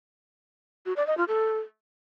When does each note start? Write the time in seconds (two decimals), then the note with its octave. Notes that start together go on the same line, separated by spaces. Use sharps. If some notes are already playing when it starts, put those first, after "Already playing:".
0.86 F#4
0.96 D5
1.07 D#5
1.18 F4
1.28 A4